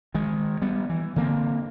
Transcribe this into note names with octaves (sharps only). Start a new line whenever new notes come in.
D#3 G#3
G3 B3
E3
D3 A#3 C4